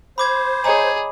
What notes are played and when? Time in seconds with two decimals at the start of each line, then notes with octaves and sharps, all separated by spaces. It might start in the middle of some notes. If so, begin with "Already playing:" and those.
0.18 C5 B5 D6 G#6
0.64 G#4 C#5 D#5 A#5